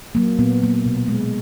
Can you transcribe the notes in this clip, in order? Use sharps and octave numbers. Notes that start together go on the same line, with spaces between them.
F#3 A#3
A#2 B3
F#3 A#3
B2
G#3